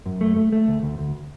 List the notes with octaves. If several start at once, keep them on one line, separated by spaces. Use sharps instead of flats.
F#2
A3
A3
A3
D2
D2
D2